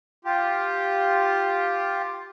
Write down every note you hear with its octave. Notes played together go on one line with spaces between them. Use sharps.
F4 G4